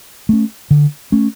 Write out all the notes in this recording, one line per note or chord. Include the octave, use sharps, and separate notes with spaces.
A3 C#4
D3
A3 C#4